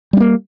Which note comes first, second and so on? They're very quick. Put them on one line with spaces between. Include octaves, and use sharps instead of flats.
G3 C#4 A#3